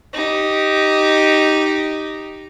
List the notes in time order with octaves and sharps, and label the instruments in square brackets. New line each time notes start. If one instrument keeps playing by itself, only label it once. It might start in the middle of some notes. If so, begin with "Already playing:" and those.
[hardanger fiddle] D#4 G4